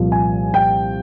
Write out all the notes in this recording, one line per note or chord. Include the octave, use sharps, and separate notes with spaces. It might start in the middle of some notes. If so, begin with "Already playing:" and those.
Already playing: C2 A#2 F3
G#5
G5